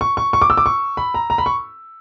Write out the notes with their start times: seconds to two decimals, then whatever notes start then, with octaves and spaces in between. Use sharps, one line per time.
0.01 C#6
0.17 C#6
0.33 C#6
0.42 D6
0.50 E6
0.57 D6
0.66 C#6
0.97 B5
1.14 A#5
1.30 A#5
1.38 B5
1.46 C#6